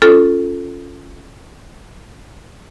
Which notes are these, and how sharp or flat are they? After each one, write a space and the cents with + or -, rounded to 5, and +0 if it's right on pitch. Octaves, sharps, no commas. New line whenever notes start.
C#4 +0 F4 +0 A4 +0